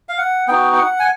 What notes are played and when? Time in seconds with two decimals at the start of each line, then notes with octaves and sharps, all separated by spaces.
0.09 F5
0.18 F#5
0.48 B3 D#4 F#4 G5
0.73 G5
0.78 F#5
1.00 G#5